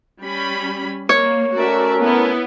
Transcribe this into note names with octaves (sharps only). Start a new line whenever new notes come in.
G3 C#4 B5
A#3 C#5
A3 C#4 F#4 A#4 D5 E5
B3 E4